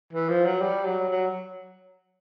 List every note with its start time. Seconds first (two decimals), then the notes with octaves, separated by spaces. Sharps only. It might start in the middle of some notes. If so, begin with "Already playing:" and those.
0.13 E3
0.29 F3
0.45 F#3
0.61 G3
0.86 F#3
1.09 F#3